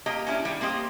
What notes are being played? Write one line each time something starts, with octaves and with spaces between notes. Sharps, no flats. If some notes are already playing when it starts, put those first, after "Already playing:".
A#3 G4 D#5 A#5
C#4 D4 E4
D#3 G3
A#3 C4 G4 D#5